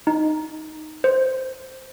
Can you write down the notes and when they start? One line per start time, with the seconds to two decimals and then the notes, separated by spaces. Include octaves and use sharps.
0.07 D#4
1.04 C5